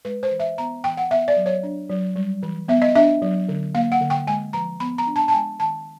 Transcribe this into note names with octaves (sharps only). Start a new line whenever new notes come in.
G#3 B4
C5
E3
E5
B3 A#5
E3 G5
F#5
B3 E5
D5
F#3
C#5
D4
F#3
G3
E3
B3 E5
D#5
D4 E5
F#3
D3
A#3 F5
F#5
D3
G5
G#3 G#5
F3 A#5
B3 B5
A#5
D4
A5
A5
G#3 G#5
D#3 A5